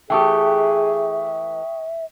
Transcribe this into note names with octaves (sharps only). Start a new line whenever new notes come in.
E3 A3 G4 G#4 E5 G5 C#6 D#6